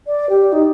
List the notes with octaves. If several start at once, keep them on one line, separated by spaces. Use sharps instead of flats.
D5
G4
D#4